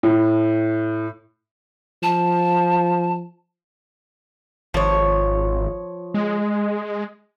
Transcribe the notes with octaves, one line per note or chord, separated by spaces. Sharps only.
A2
F3 A5
G#1 F3 C#5
G#3